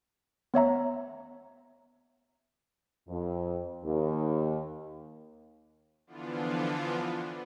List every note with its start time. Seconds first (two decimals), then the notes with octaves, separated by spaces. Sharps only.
0.54 B3 C#5 E5 A#5
3.08 F2
3.84 D#2
6.07 D3 E3 F3 B3 D4 F4